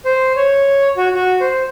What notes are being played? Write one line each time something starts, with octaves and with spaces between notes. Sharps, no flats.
C5
C#5
F#4
F#4
C5